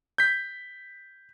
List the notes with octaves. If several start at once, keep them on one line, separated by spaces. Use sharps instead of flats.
G6 B6